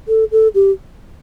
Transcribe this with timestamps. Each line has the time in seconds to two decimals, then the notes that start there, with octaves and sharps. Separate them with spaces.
0.08 A4
0.32 A4
0.55 G4